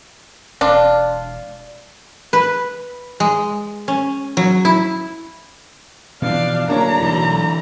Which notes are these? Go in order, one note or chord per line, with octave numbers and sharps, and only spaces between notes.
E1 D4 F4
B4
G#3
C#4
F#3
E4
B2 E3 F3 D4 F5
D1 A#3 D4 C#5 A#5
B1 D3 E3